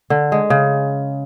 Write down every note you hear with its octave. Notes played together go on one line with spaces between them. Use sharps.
D3
G#3
C#3